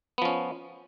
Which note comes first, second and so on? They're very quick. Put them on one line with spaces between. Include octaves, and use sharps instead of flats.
B3 F3 C#4